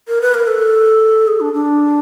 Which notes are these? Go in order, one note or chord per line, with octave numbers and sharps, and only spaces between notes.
A#4
B4
A#4
A4
G#4
D4
D4